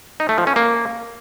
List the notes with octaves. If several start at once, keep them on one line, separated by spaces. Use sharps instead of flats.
D#4
A3
F3
C#4
A#3